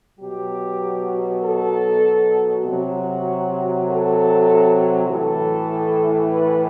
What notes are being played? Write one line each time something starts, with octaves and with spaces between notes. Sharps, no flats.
B2 F#3 G4
A4
C3 F#3 F#4
A4
A2 E3 A4
B4